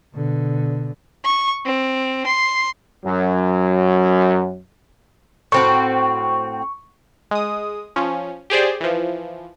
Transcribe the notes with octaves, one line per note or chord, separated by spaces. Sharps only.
B2 D3
C#6
C4
C6
F#2 F#3
A2 C4 F#4 C#6
G#3 D#6
F3 C#4
G4 G#4 C5 D5
E3 F3